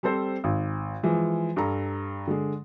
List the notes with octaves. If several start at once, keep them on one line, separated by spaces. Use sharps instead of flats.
G3 C4 A4 C5
G#1
E3 F3 G#3
G2 A4 A#5
D3 G#3